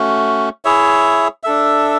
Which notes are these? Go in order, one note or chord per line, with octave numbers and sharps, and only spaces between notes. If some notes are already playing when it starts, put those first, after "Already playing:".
Already playing: A3 C#4 F#4
E4 G#4 C#5 E5
D4 A4 E5